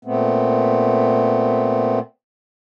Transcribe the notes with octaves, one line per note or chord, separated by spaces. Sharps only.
A#2 A3 B3 C4